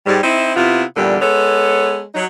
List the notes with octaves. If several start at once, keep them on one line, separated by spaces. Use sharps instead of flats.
G#2 G3
C4 D#4 E4
C3 B3 E4 F4
E2 A#2 D3 G3
G#3 B3 A4 C#5
F#3 D#4